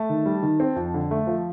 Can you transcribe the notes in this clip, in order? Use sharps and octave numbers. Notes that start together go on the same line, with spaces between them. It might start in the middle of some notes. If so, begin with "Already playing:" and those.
Already playing: A3 A5
D#3
G3
D#3
C4
F2
D3
A3
F3